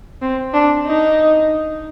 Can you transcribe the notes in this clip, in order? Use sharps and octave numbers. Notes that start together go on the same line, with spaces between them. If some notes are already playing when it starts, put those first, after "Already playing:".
C4
D4
D#4